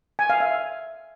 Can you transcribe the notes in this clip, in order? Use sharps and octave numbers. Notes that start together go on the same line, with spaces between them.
G#5
F5
E5